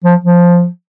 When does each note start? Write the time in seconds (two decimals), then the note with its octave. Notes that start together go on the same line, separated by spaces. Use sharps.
0.04 F3
0.24 F3